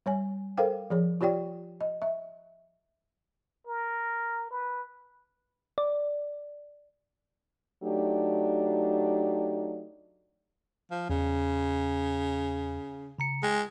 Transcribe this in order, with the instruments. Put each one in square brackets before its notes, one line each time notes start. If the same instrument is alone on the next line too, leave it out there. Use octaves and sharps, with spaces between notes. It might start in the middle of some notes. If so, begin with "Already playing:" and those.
[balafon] G3 C#5 G#5
A4 A#4 C5 F5 G5
F3 G#4 C#5
F4 G4 C#5 D5 G5
D#5
E5
[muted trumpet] A#4
B4
[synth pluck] D5
[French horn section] F#3 A3 D4 D#4 G4
[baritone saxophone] F3
[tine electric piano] E2 [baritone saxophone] C#3
[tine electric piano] C#3 A#5 C#7
[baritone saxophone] G#3 [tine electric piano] G5